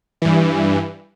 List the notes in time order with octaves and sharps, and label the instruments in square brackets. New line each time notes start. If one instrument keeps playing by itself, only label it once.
[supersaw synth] G2 E3